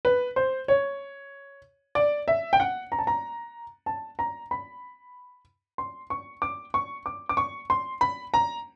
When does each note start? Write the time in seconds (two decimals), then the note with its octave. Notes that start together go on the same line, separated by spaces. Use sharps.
0.05 B4
0.36 C5
0.68 C#5
1.95 D5
2.28 E5
2.53 G5
2.60 F#5
2.92 A#5
2.99 A5
3.07 A#5
3.86 A5
4.19 A#5
4.51 B5
5.78 C6
6.10 C#6
6.42 D6
6.74 C#6
7.06 D6
7.29 D6
7.37 C#6
7.70 C6
8.01 B5
8.34 A#5